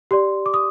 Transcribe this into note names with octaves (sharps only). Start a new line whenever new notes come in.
G4 D5 C6
D6
D#6